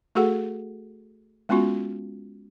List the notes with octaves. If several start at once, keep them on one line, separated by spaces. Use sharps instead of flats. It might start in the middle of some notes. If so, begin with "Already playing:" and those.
A3 F#4 G#4 A4 F#5
G#3 B3 C#4 F4 F#4